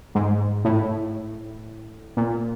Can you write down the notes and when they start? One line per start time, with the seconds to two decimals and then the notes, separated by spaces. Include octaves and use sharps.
0.15 G#2
0.65 A2
2.17 A#2